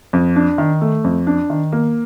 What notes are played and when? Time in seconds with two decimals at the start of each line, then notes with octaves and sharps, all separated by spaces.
0.13 F2
0.36 D4
0.58 D#3
0.81 A3
1.04 F2
1.27 D4
1.50 D#3
1.72 A#3